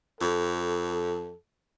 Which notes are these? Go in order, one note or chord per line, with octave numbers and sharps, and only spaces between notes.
F2 A4